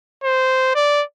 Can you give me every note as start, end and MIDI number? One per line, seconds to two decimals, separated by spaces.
0.24 0.73 72
0.75 1.03 74